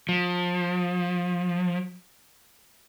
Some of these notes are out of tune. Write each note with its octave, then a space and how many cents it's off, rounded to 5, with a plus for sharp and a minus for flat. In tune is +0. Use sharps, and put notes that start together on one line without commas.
F3 +30